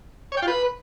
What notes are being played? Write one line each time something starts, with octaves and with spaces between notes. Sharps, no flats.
C#5
G5
F4
B4